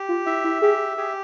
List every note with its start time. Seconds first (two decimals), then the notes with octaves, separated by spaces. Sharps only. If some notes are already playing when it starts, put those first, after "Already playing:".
Already playing: G4
0.09 F4
0.26 E4 E5
0.44 E4
0.62 G4 G#4
0.97 G4 G#4